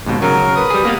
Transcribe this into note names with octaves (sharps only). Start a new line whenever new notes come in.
D#2 G#2 B2
C#3 F#3 A#4
B4 D#6
G3 G#4
A#3 B3 F5